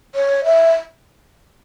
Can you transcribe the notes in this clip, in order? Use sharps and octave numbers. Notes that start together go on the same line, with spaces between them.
C#5
E5